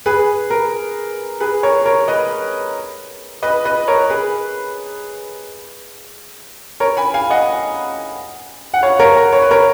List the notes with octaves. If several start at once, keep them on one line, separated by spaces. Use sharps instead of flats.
G#4 B4
A#4
G#4 B4
A#4 C#5
A#4 C#5
B4 D#5
B4 D#5
B4 D#5
A#4 C#5
G#4 B4
A#4 C#5
G#5 B5
F5 G#5
D#5 F#5
F#5
C#5 F5
A#4 C#5
A#4
C#5
B4
A#4 C#5